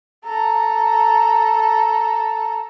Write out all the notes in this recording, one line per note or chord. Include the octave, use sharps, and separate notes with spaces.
A4 A#5